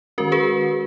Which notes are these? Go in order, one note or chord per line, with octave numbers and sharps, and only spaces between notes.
D#3 G#3 C#4 F#4 A#4
G#4 B4